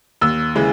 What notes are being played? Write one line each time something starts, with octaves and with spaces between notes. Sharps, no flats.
D#2 E6
C#3 E3 G#3